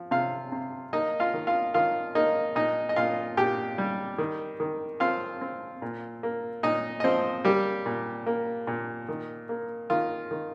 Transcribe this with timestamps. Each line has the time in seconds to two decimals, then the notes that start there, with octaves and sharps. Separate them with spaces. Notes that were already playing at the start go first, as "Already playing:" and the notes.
Already playing: F3
0.11 C3 F4 F5
0.52 C3
0.93 A#3 D#4 D#5
1.20 F4 F5
1.34 D#3
1.47 F4 F5
1.74 D#3 F4 F5
2.15 A#3 D#4 D#5
2.55 A#2 D#4 D#5
2.89 D#5
2.96 A#2 F4 F5
3.37 A#2 G4 G5
3.78 G3
4.18 D#3
4.60 D#3
5.00 C4 F4 F5
5.41 C4
5.82 A#2
6.23 A#3
6.63 A#2 D#4 D#5
7.00 D#5
7.04 F3 C4 C5
7.45 G3 A#3 G4
7.86 A#2
8.27 A#3
8.67 A#2
9.09 D#3
9.49 A#3
9.90 D#3 F4
10.31 D#3